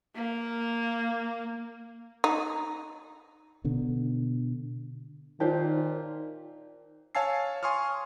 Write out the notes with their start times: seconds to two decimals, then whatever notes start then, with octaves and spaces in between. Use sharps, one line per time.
0.15 A#3
2.24 D#4
3.64 B2 D3
5.40 A#2 D#3 D#4 F4 G4 C5 C#5
7.15 C#5 F5 G#5 A5 E6 C7
7.63 G#5 C6 C#6 D#6 F6